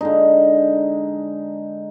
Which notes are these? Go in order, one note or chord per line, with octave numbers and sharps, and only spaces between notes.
D3 G#3 D#4